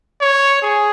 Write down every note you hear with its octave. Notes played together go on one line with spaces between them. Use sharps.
C#5
G#4